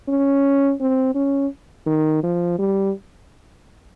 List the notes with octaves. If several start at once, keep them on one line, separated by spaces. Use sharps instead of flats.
C#4
C4
C#4
D#3
F3
G3